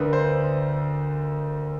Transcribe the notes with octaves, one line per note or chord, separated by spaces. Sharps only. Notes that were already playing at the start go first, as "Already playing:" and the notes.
Already playing: D2 D3 A#4 B4
C5